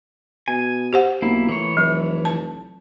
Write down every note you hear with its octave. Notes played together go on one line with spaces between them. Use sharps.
B2 G#5
G4 C5 F#5
B1 A#3 E4
A2 E3 C#5
F1 F#3
A5